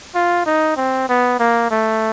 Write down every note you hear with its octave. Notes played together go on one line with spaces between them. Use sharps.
F4
D#4
C4
B3
A#3
A3